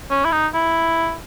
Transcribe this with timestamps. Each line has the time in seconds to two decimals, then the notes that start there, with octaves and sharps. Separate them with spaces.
0.10 C#4
0.25 E4
0.32 D#4
0.54 E4